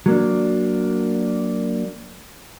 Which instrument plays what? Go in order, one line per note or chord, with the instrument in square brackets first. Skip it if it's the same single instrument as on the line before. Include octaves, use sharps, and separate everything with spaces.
[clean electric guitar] F#3 A#3 D4